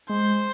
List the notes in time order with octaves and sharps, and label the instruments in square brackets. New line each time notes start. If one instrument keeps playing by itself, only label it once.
[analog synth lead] G#3 [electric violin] C5